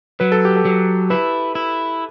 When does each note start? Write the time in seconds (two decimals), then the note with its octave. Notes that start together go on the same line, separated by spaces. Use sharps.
0.20 F#3 B4
0.32 A4
0.45 G4
0.57 A4
0.65 F#3
1.10 E4 B4
1.55 E4